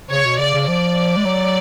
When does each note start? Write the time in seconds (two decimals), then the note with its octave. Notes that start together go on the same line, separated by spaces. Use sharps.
0.10 C#3 C#5
0.25 B2
0.39 C#3 D5
0.54 C#3
0.68 F3 D5
1.17 G#3
1.25 F#3